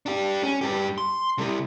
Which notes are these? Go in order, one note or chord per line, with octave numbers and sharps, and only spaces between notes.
D4 G4
C#4
G2 G4
C6
C3 G3